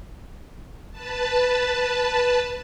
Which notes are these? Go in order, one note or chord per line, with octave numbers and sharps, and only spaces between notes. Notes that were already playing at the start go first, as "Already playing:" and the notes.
B4 A5